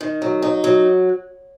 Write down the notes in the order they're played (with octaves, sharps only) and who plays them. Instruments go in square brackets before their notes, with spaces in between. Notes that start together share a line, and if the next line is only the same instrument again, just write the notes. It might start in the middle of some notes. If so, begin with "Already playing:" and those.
[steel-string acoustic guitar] D#3
F#3
D#4
F#3